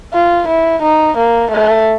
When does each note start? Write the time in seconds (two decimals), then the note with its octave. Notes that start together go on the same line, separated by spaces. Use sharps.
0.14 F4
0.48 E4
0.83 D#4
1.18 A#3
1.51 A3